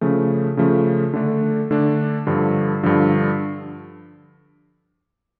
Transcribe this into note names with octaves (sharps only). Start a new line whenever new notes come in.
C#3 F3 A3
C#3 F3 A3
D3 A3 D4
D3 A3 D4
G2 D3 F3
G2 D3 F3